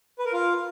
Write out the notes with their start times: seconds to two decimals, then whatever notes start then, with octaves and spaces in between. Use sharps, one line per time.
0.19 B4
0.26 A#4
0.32 F4